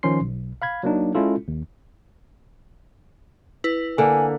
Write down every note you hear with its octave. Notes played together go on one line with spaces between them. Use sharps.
D#3 F3 C#4 C6 C7
B1
F5 B5 G#6
F#3 A#3 D4 D#4
G#3 C#4 E4 F4 A4
D#2
E4 B4
D3 A#3 G#5